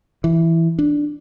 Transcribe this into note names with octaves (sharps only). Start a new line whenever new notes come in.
E3
D4